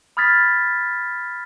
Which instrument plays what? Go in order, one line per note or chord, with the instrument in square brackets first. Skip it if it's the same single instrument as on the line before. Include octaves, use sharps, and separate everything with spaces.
[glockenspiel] B5 D#6 F6 G#6 A6 B6